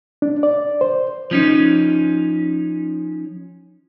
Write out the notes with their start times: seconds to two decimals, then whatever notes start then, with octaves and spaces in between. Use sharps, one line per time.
0.22 D4
0.43 D5
0.81 C5
1.31 F3 C#4 D#4